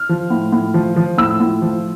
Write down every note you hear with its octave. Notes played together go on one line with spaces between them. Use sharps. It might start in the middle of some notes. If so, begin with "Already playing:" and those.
Already playing: F6
F3
A2
A2
F3
F3
A2 E6
A2
F3